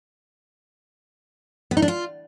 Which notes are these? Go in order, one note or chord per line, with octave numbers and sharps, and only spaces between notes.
B3
D#4
D4
F4